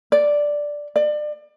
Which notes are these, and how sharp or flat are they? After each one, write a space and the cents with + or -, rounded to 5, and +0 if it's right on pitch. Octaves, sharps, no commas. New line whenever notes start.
D5 +0
D5 +30